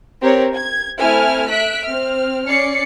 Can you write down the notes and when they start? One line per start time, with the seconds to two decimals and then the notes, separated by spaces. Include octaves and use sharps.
0.21 C4 G4 A#4 C#5
0.53 G#6
0.99 A3 C4 E4 G#5 F6
1.49 E5 F#6 B6 D7
1.84 C4 F6
2.48 C#4 D5 C7 C#7